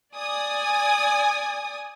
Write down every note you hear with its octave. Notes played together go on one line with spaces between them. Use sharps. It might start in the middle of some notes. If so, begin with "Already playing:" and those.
D5 G#5 D#6